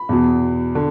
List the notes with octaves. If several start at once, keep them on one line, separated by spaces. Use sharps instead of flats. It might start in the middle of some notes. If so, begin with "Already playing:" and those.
Already playing: B5
E2 B2
D3